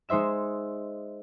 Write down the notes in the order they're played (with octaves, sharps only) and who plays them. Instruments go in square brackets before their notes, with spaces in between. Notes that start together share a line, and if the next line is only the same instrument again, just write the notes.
[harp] G#3 D#4 C5 E5 E7